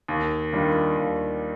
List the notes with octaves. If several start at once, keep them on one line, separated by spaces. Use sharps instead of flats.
D#2
D#3 G3 D4 F4
D#2